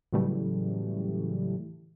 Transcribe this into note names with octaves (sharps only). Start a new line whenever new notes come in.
A2 C#3 E3 F#3 G3 A3